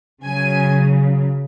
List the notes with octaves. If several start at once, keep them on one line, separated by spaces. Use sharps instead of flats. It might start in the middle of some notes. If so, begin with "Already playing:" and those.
C#3 F#3 G#5